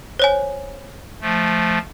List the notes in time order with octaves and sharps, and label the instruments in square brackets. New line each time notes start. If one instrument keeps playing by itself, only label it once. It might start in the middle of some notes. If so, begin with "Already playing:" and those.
[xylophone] C5 C#5 G#5
[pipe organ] F3 A3